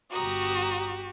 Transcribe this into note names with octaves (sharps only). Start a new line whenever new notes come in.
G1 F#4 G4 A#5 D#6